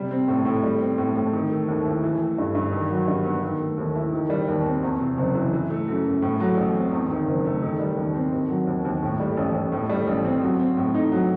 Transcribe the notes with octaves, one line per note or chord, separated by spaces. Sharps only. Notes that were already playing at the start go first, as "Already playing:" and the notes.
Already playing: C3 G3
C4
A2
A2
G3
C4
A2
A2
D#3
A3
D#2
E4
E3
A3
G2
G2
D#3
F#3
G2
B3
D#3
A3
D#2
E4
D#3
G3
D#2
C4
E2
C3
F#1
E3
E3
A3
F#2
F#2
A2
F#3
A1
C4
E2
D#3
F#1
A3
D#3
G3
D#2
C4
D#3
F#3
D#2
D#2
A2
G3
A1
A1
A2
G3
A1
C4
F#3
C4
A2
D#4
F#3